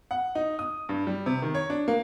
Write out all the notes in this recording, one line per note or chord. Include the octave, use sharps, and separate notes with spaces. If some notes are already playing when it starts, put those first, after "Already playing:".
F#5
D#4
D#6
G2
G3
C3
D#3
C#5
D4
A#3